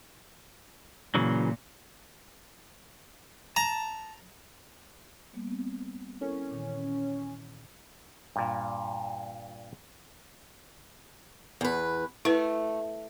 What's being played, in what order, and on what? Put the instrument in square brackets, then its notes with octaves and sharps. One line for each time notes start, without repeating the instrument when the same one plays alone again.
[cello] A#2 [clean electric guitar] C#3 E3 F#3
[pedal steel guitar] A5 [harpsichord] A#5
[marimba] G3 A#3 B3
B3 C4
[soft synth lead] C#4 [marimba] E4 A4 A#4
[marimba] A#2 D#3 E3
[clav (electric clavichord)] G2 A#2
[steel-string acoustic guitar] E2 B4
[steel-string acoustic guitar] A3 [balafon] E4 B4